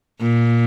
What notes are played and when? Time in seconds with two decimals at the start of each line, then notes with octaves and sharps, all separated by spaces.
0.21 A#2